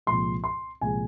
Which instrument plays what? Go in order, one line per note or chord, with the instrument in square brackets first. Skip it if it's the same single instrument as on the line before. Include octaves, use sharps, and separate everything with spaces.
[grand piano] C2 A#2 F3 G#3 C6
C6
C2 A#2 F3 G#3 G#5